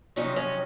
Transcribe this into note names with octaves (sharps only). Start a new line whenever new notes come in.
F2 C3 D#3 F#3 C#4 D#4
C#4 D#4